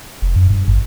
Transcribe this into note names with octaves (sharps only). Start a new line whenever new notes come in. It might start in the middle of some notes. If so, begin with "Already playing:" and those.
F1
F#2
G2
G#1